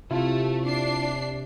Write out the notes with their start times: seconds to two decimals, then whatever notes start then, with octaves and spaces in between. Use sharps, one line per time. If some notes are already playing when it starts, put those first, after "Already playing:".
0.11 C3 A3 E4 F4
0.65 D4 C7